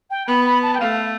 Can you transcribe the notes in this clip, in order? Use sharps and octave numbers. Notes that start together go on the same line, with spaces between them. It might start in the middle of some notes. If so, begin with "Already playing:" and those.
G5
B3 B5
B5
A5
G5
A3 F5